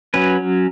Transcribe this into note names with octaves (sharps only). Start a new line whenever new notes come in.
F#3 C#4 B4